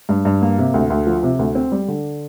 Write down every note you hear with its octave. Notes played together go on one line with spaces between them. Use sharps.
G2
G2
A#3
C3
D2
D2
F3
C3
D2
C4
G3
D3